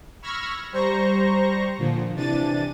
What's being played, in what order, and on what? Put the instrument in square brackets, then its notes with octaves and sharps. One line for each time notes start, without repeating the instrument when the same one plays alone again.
[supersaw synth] B5 C#6 E6 F6 G#6 A#6
G3 C5 A#5 C#6 A#6
A#2 D3 F3
C3 E3 D4 A6 D#7